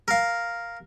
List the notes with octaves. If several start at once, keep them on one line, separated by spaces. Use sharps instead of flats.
A#4 F5